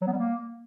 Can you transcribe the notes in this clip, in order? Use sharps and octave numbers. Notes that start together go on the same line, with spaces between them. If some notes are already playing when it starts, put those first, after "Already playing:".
F#3
B3
G3
A#3